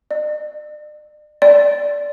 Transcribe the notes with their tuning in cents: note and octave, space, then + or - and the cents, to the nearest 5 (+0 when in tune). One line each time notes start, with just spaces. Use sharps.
D5 +40
D5 -15